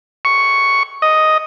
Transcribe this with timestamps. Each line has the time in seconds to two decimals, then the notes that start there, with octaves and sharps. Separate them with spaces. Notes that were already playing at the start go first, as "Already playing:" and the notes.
0.25 C#6
1.02 D#5